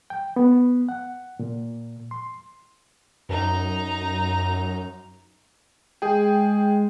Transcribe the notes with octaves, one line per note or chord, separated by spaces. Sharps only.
G5
B3
F#5
A#2
C6
F#2 D#4 A#5
G#3 G#4 G5